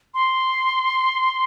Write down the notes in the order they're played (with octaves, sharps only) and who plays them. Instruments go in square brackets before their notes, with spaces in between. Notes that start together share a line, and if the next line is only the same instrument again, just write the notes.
[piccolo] C6